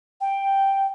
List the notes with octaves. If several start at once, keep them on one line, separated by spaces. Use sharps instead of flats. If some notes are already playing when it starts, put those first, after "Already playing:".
G5